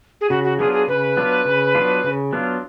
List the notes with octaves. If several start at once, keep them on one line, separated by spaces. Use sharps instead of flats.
G#4
C#3 F#4
F#4
F#3 B3 D4 F4 G#4
G#4
C#3 B4
F#3 B3 D4 F4
C#3
F#3 B3 D4 F4
C#3
F#3 B3 D4 F4